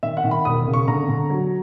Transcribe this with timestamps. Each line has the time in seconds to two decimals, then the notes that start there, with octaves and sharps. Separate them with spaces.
0.03 D#3 E5
0.17 F#5
0.24 D#3
0.31 B5
0.45 E1 D#6
0.67 C#3
0.74 C#6
0.87 D3 A#5
1.09 D3
1.30 F#3